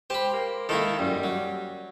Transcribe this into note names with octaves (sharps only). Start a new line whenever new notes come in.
G4 C5 B5
A#3
D#3 A#3 E4 A4
F#2 G3
F#3